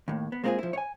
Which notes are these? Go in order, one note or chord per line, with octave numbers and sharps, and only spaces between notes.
D#2 A2
B3
G#3 A#3 C4 E4 F4 G#4
F3 E4
C#5 G#5